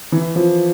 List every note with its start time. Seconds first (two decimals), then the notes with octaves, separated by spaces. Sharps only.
0.12 E3
0.36 F3